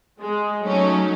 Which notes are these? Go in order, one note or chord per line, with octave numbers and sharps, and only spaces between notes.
G#3
F#3 A3 C#4 D#4